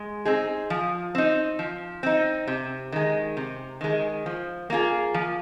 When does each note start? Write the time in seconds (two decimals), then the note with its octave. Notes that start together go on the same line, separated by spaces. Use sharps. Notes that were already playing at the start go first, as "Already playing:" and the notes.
Already playing: G#3
0.25 C4 D#4 G#4
0.70 F3
1.15 C4 D#4
1.59 F3
2.03 C4 D#4
2.47 C3
2.92 D#3 G#3
3.37 C3
3.81 D#3 G#3
4.26 F3
4.70 A#3 F4 G#4
5.14 F3